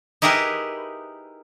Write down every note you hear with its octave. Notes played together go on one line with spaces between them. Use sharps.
D#4 E4 G4 G#4 A#4 B4